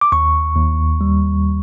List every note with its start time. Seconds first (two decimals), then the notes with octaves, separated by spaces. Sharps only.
0.01 D6
0.12 D#2 C#6
0.56 D#2
1.01 G3